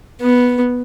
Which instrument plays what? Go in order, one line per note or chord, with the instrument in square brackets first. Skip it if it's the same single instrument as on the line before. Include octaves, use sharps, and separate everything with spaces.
[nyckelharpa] B3